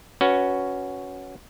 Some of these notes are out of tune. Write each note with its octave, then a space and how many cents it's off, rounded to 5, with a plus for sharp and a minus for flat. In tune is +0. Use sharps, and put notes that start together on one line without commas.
C#4 +5 F#4 +0 B4 +0